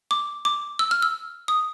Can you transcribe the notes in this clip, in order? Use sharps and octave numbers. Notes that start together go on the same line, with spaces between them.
D6
D6
E6
F6
E6
D#6